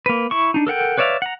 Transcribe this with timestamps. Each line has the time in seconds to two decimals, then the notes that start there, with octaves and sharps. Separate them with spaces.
0.06 A#3 B4
0.31 E4 C#6
0.54 D4 D#4
0.67 A4 A#4 F#5 G5
0.98 B4 C#5 D5 E5 F5
1.22 F#5 A#5